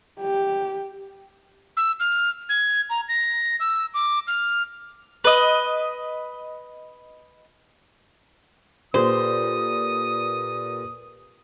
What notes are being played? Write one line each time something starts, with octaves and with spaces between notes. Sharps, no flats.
G4
E6
F6
G#6
A#5
A#6
E6
D6
F6
B4 D#5
A#2 G4 A4 B4 C5 D#6